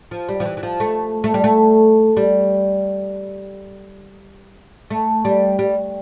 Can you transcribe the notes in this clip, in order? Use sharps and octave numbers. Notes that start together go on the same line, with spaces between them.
F3
G3
F3
E3
E3
F3
A3
A3
G3
A3
G3
A3
G3
G3